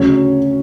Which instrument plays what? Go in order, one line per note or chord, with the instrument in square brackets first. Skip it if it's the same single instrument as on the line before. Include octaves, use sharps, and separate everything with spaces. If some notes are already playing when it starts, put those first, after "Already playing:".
Already playing: [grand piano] D2 C#3 F#3 C#4 C#5